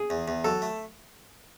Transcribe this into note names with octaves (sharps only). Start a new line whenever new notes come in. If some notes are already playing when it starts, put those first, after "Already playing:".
Already playing: G#4
E2
E2
F#3 A4
A3